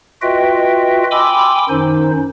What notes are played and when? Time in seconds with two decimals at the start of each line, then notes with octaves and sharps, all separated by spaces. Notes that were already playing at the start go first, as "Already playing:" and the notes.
0.22 F4 F#4 B4 D#5 E5 G5
1.11 G5 G#5 B5 C6 D6 E6
1.69 F#2 D#3 C#4 D#4 C5